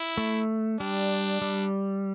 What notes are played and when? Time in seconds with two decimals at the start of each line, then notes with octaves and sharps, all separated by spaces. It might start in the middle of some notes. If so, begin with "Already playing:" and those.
Already playing: E4
0.18 A3
0.79 G3 D4
1.42 G3